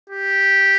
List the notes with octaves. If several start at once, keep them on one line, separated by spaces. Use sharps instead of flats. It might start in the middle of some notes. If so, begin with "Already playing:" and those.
G4